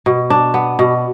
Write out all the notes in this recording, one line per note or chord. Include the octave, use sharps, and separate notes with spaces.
B2
D4
B3
B2